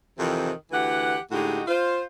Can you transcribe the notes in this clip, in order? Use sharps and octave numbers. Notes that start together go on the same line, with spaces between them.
F2 C3 D#3 E3
D2 E3 G4 F#5
A2 D3 G#3 D#4 F#4 G4
F4 C5